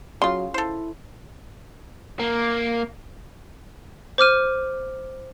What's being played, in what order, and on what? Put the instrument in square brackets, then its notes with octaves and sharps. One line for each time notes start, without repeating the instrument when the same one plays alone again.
[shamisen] C#3 F4 [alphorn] F#3 [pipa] C6
[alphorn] E4 [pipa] A4 C5
[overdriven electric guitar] A#3
[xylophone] C5 D6 F6 D#7